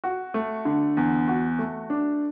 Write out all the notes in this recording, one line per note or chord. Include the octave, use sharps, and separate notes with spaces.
F#4
A3
D3
E2
F#4
A3
D4